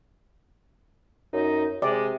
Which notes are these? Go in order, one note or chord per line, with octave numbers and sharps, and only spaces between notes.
F#2 D#4
C3 G#3 D5